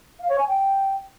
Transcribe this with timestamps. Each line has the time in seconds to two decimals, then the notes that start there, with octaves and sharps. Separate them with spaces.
0.20 F5
0.29 C#5
0.38 G#5
0.48 G5